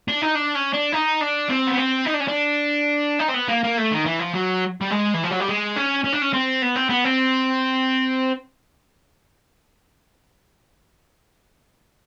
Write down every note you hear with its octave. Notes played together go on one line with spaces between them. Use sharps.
D4
D#4
D4
C#4
D4
D#4
D4
C4
B3
C4
D#4
D4
C#4
D4
D#4
C4
B3
A#3
A#3
A3
D#3
E3
F3
F#3
G3
G#3
E3
F3
F#3
G3
G#3
C#4
C#4
D4
C#4
C4
B3
C4
B3
C4